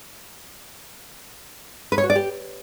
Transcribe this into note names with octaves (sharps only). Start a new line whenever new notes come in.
B4
C#5
F#4
D5
G4